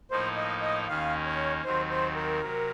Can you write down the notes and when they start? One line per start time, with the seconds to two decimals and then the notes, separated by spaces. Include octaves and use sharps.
0.11 A2 F3 A#3 D#4 C5
0.37 D#5
0.62 D#5
0.88 D#2 D#3 A#3 C#4 F5
1.26 C#5
1.64 D#2 D#3 F#3 C4 C5
1.90 C5
2.16 A#4
2.41 C3 F#3